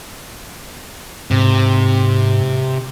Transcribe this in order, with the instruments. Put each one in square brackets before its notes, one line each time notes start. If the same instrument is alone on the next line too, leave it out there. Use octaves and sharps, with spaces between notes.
[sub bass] G#2 [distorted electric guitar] C3